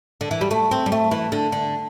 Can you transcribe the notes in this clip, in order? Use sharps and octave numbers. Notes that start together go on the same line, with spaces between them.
D3
E3
G3
A3
C4
G3
A3
E3
D3
D3